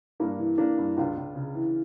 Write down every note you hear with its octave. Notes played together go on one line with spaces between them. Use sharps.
G2 A#3 D4
E3
E3 A#3 D4
G2
C#2 D4 F4
C#2
C#3
E3